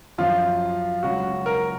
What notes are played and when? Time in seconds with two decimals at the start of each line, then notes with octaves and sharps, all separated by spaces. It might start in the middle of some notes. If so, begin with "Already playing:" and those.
0.18 F#2 F3 F4
1.03 C#2 C#3 F#3 F#4
1.46 A#4